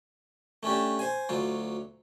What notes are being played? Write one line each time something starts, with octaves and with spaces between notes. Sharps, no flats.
A3 C#4 D4 G4
C5 G#5
D2 F#3 F4